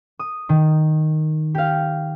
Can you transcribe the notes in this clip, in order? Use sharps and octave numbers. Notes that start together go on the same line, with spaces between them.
D#6
D#3
G4 F5